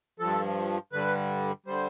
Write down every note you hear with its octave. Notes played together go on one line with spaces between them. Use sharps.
G2 F3 A4
G2 D3 G3 B4
D3 G3 C5